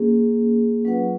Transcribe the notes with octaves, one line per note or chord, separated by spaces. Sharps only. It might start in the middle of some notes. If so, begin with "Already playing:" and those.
Already playing: A#3 C#4 G#4
F#3 C#4 F4 B4 F#5